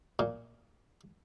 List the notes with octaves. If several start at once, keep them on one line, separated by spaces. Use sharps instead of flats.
A#2